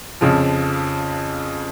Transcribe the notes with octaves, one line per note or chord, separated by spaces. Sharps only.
F2 C#3 F3